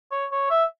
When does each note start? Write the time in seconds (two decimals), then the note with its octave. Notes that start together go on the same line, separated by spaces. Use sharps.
0.11 C#5
0.32 C#5
0.50 E5